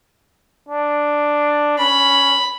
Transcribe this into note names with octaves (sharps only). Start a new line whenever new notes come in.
D4
C#4 B5